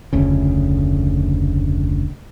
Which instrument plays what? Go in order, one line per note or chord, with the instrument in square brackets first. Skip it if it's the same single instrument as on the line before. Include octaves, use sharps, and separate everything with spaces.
[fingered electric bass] F1 D2 C#3